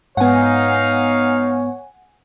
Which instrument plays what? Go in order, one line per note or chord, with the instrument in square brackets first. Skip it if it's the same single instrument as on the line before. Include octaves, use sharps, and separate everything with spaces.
[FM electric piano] G#2 B3 [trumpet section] D#4 F5 [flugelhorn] C#5 [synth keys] F#5 G#5